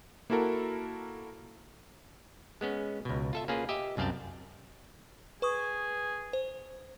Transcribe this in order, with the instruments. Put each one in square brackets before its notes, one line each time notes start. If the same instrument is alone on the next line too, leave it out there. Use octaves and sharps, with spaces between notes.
[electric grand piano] A#3 E4 F#4 A4 A#4
[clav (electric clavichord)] G#3 B3 C#4
C#2 B2
F4 A4 E5
A#3 C#4 F4 G#4 B4
G4 D#5 E5
C2 F#2 C4 F5 G5 A5
[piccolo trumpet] G#4 [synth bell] B4 C#6 D#6
[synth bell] C5